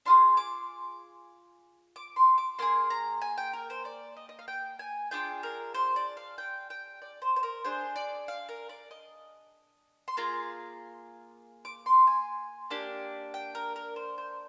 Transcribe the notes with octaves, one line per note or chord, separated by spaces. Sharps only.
D4 F4 G#4 C6
D6
D6
C6
D6
A#3 F4 G#4 C6
A#5
G#5
G5
A#4
C5
D5
D#5
D#5
F5
G5
G#5
D4 F4 G#4 G5
A#4
C5
D5
F5
G5
G5
D5
C5
C5
A#4
D4 G#4 C5
D5
F5
A#4
D5
D#5
C6
A#3 F4 G#4 A#5
D6
C6
G#5
A#3 D4 G4
G5
A#4
A#4
C5
C5